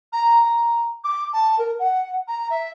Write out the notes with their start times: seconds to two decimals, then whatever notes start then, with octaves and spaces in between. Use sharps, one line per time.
0.12 A#5
0.42 A#5
1.04 D6
1.33 A5
1.58 A#4
1.79 F#5
2.28 A#5
2.50 E5